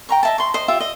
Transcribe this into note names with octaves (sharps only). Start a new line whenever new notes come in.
G5 A#5 C#6
D#5 E5 A5
C6 C#6
C5 D#5
F4 G4 E5
D#5